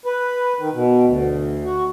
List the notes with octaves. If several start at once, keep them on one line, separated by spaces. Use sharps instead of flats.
B4
D#3
B2
D2
F#4